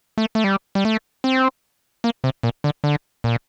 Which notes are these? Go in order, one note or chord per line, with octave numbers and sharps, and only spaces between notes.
A3
A3
G3
G3
A3
C4
A#3
C3
A#2
D3
D3
A#2